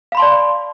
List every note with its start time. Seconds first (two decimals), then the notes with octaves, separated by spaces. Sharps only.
0.12 F5
0.15 B5
0.17 C6
0.20 A5
0.22 D5